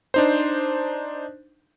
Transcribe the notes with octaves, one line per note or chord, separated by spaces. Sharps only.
D4 D#4 C5